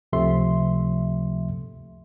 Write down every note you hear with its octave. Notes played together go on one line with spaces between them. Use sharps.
C#2 C3 F3 A3 E5 C6